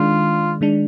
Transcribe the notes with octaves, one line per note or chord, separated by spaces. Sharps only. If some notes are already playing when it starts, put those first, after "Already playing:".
Already playing: D#3 G#3 D4 F4
D#3 G#3 D4